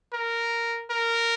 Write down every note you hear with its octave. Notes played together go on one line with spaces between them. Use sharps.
A#4
A#4